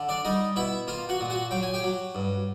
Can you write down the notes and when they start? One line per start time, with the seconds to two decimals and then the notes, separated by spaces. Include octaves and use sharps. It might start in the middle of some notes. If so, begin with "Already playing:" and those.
Already playing: D3
0.09 D4 D5
0.25 G3 D#4 D#5
0.56 B2 E4 E5
0.88 A#3 F4 F5
1.09 F#4 F#5
1.20 A#2
1.30 F#4 F#5
1.51 F#3 G5
1.63 G#5
1.74 G4 G5
1.83 F#3
2.15 G2